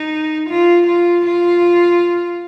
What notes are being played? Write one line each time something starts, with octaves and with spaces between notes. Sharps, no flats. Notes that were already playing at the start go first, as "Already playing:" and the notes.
Already playing: D#4
F4
F4
F4